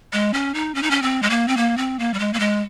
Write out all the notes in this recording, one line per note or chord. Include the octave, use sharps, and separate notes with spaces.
G#3
C#4
D#4
C#4
D#4
C#4
C4
G#3
A#3
C4
A#3
C4
A#3
G3
G#3
A#3
G#3